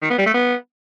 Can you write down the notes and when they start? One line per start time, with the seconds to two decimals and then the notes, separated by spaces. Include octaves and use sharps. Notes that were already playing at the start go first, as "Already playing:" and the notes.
0.02 D#3
0.10 B3
0.18 G3
0.26 A3
0.34 B3